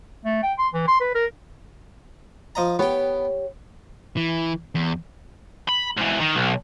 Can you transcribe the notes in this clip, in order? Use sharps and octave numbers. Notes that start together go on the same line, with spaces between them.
A3
G5
C6
E3
C6
B4
A#4
F3 D#5 A#5
B3 G4 C#5 G5
E3
E2
B5
G#2 E3
D#3
B1